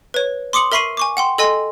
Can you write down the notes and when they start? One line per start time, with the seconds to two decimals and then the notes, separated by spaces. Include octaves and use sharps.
0.14 B4 C#5
0.53 C6 D6 D#6 C#7 F#7
0.72 A#4 E5 B5 C#6 C7 D#7
0.97 G#5 C#6 D6
1.17 F#5 G5 C6
1.38 A4 D#5 G#5 C6